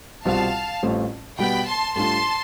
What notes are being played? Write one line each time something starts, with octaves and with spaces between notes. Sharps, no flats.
C2 B2 G3 C4 F4 F5 A5
A1 A2 G3 C4 F4
B2 G3 B3 G5 B5
A5 C6
A2 G3 D4 F4 A4 A5 C6